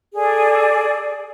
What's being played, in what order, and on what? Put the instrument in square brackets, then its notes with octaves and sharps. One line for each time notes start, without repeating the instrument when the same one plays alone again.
[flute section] G#4 A4 D5